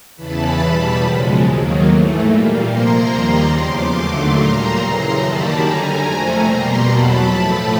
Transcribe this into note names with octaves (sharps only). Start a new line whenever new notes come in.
E2 C#3 E3 A5 B5
E2 B2 G3
F#2 C#3 F3 G#3
D#2 D#3 F#3 A#3
G#2 E3 A3
A#2 G3 A#3
C3 F3 A#3 A#5 C6
D#2 D#3 G3 A#3
E2 C#3 F3 C6 D6
D#2 D3 F#3 A3
A#2 G3 A#3 A#5 C6
F#2 C#3 E3
F#2 D#3 G3 A#3 A5 B5
F#2 D3 G3 G#5 A#5
F2 C3 F3 A3
B2 G3 A#3 A#5 C6
E2 B2 F#3 A5 B5
A2 F3 A3